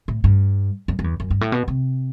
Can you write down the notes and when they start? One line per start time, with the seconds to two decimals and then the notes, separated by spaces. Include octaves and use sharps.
0.08 A2
0.24 G2
0.88 F#2
0.99 F#2
1.04 E2
1.20 F#2
1.30 G2
1.41 A2
1.52 B2
1.68 C3